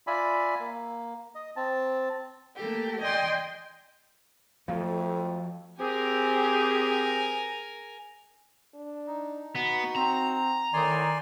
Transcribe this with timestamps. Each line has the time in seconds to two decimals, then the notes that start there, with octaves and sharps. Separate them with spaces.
0.07 F4 D5 E5 G#5 B5
0.60 A#3
1.35 D#5
1.56 C4 A5
2.55 A3 A#3 G4 A4
3.00 D5 D#5 G5 G#5 C6
4.68 F2 F3 F#3 A3 F5
5.80 C4 G4 G#4 A#4 G#5
8.75 D4
9.07 D#4
9.56 B3 F#4
9.96 C4 A#5
10.73 A2 D#3 D5 G#5 C6